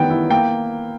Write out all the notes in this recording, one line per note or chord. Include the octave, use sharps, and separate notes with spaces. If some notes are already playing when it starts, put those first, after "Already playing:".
Already playing: D#3 G3 B3 G5
E4
A#3 G5